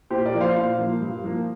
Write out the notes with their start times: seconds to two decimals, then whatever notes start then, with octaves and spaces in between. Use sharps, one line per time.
0.10 A#2 G4 C5
0.25 A#4 D5
0.33 F3 A#3
0.41 C5 F5
0.56 A#2 C5 F5
0.79 F3 A#3
1.01 G2
1.24 F3 A#3